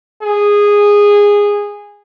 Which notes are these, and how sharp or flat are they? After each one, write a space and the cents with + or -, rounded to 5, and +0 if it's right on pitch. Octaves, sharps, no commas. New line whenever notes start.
G#4 -15